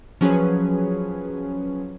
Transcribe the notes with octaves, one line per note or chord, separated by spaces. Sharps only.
F3 F#3 C#4 G#4 B4 C#5